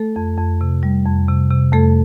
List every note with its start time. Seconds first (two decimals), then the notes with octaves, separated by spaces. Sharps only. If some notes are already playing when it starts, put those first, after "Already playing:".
Already playing: A3 A4
0.16 F2
0.38 F2
0.61 C3
0.83 G3
1.06 F2
1.29 C3
1.51 C3
1.73 F2 A3 A4